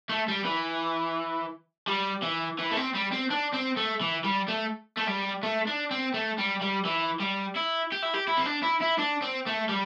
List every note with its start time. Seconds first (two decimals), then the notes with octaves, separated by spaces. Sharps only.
0.09 A3
0.28 G3
0.45 E3
1.87 G3
2.23 E3
2.59 E3
2.72 A3
2.77 C4
2.95 G3
3.12 C4
3.30 D4
3.53 C4
3.77 A3
4.01 E3
4.24 G3
4.48 A3
4.97 A3
5.07 G3
5.43 A3
5.67 D4
5.91 C4
6.14 A3
6.38 G3
6.62 G3
6.85 E3
7.20 G3
7.56 E4
7.92 G4
8.03 E4
8.14 G4
8.27 E4
8.37 C4
8.46 D4
8.62 E4
8.81 E4
8.99 D4
9.22 C4
9.46 A3
9.69 G3